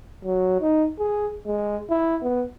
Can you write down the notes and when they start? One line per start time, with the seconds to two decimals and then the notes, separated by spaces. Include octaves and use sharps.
0.25 F#3
0.61 D#4
0.99 G#4
1.47 G#3
1.90 E4
2.23 B3